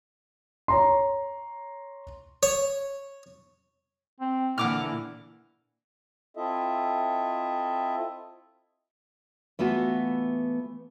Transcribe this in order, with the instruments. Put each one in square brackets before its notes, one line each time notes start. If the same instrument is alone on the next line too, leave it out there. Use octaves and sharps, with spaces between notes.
[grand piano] C#5 A#5 C6
[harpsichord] C#5
[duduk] C4
[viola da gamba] A#2 D3 E3 [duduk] E4 [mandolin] F#5 D6 F6
[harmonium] C4 E4 F4 A4 D#5 E5
[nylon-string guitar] E3 A3 B3 F4 F#4